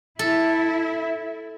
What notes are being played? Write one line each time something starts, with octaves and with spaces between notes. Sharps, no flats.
E4 A4